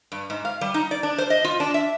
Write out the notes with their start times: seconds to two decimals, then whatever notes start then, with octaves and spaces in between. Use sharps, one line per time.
0.12 G2
0.30 G#2
0.45 F5
0.61 G3
0.74 D#4
0.91 D5
1.03 D4
1.18 C5
1.30 D#5
1.44 F4
1.60 D4
1.74 E5